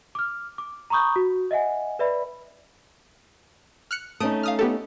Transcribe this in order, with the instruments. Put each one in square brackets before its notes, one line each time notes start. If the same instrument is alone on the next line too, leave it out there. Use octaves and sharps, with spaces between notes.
[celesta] D6 F6
D6
A#5 B5 C#6 D#6 G6
F#4
D#5 E5 F#5 G#5
B4 D5 E5 B5
[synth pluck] F6 F#6 C#7
[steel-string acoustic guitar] A3 C#4 D#4 [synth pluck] D#6 D7
[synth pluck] F5 D#6 F6
B3 G4 A4